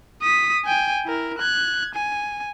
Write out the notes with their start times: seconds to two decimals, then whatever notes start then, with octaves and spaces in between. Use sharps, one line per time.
0.22 D#6 B6
0.65 G5 G#5
1.05 E4 A#4
1.38 F#6 G#6
1.95 G#5